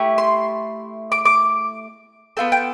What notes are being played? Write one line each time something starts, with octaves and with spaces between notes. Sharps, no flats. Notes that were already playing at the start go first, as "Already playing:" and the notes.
Already playing: A3 E4 G4
C6
D6
D6
B3 F4 A4 G5
G5